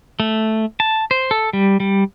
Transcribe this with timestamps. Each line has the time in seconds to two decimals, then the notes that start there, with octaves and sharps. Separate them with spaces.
0.20 A3
0.80 A5
1.11 C5
1.31 A4
1.53 G3
1.80 G3